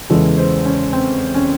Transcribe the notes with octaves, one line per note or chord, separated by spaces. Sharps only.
E2 C#3 E3 G#3 A4
C5
C#4
C4
C#4